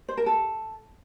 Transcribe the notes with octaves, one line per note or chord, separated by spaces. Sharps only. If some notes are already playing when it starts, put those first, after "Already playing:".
C5
A#4
A4